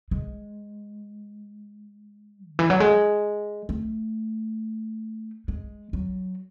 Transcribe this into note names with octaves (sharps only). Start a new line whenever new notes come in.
G#3
D3
E3
F#3
G#3
A3
G#3
F#3